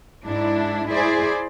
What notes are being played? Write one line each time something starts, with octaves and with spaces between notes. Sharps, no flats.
G#2 D4 E4
E4 G#4 C5 D5